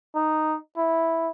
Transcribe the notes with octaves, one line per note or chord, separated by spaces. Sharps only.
D#4
E4